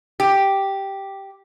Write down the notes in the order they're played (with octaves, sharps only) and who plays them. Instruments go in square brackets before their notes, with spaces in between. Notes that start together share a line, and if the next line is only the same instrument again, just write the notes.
[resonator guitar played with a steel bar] G4